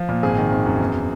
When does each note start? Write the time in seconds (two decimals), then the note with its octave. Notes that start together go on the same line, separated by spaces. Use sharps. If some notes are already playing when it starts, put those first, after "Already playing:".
Already playing: F3
0.09 A#2
0.23 G#1 G#4
0.37 D#3
0.52 G#1
0.66 F#2
0.81 E2